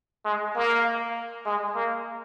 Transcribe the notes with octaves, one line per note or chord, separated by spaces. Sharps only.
G#3
A#3
G#3
A#3